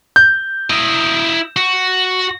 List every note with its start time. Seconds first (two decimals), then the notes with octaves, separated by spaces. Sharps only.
0.16 G6
0.70 E4 D#5
1.57 F#4